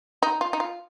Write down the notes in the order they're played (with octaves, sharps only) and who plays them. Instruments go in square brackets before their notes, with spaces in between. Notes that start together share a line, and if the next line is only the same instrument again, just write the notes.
[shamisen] D#4
F4
D#4
F4